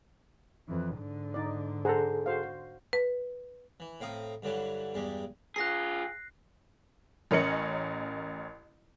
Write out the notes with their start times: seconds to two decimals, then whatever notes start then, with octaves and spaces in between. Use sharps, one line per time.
0.68 F2 E3
0.98 G#2 D3
1.34 D#4 D5
1.85 G#4 A4 C5 F#5 A#5
2.26 F#4 C5 F5
2.93 B4
3.80 E3
4.01 A2 C4 F5 A#5 D#6
4.43 G2 D3 E3 F#3 G3
4.94 E2 G2 G3 G#3
5.56 F4 G#4 F#6 A#6 C7
7.31 A1 C#4 A#4 D#5 C#7 F#7